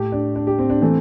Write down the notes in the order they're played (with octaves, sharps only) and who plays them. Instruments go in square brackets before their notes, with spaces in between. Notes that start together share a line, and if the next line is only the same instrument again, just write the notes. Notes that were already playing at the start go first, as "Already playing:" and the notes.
Already playing: [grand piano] A2 A3 G4
D4
D4
G4
C4
D4
E3 A3 C4